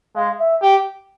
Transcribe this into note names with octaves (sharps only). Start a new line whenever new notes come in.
G#3 F5
E5
G4